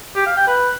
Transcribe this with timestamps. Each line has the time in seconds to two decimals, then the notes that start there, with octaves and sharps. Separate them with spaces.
0.16 G4
0.26 F5
0.37 G5
0.47 B4